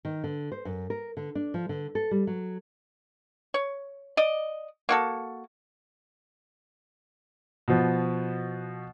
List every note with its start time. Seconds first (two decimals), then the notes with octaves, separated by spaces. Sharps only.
0.05 D#3
0.24 D3
0.52 C5
0.65 F#2
0.90 A#4
1.17 D3
1.35 D4
1.54 F3
1.69 D3
1.95 A4
2.11 G3
2.27 F#3
3.54 C#5
4.17 D5 D#5
4.89 A#3 F#4 A4
7.68 B2 F3 B3